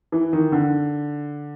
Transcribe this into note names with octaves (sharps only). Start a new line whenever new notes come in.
E3
D#3
D3